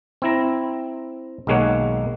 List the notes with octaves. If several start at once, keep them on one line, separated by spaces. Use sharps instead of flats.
C4 E4 A#5
B1 D#3 G#3 A#3 C#5 F#5